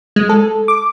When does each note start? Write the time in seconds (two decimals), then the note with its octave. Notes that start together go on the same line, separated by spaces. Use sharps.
0.16 G#3
0.29 A4
0.68 D6